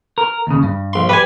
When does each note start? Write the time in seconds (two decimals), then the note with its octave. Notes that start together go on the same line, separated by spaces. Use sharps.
0.18 A#4
0.47 D#2 C#3
0.63 G2
0.93 A#1 C6
1.09 G3 G4 B4 G#5